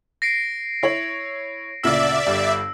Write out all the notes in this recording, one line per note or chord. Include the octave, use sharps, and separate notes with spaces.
A#6 C7 D7
E4 C#5 F#7
D2 A#2 C#3 D5 E5 E6
G1 G2 G3